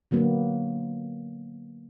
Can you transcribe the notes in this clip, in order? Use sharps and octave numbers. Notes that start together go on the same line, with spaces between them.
D3 F#3 A#3 B3